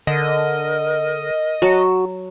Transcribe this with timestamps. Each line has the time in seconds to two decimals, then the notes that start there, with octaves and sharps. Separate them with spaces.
0.07 D3 A#4 D#5
1.62 F#3 F#4 A5